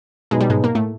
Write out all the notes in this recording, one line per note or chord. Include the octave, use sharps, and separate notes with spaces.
B2 F#3 G#3 B3 D#4
G3
G#2 G#3
A#3
A2 A3